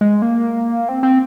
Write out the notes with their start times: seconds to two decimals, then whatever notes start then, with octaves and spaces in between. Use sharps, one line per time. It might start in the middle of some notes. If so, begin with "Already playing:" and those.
0.01 G#3
0.22 A#3
0.89 C4
1.03 C4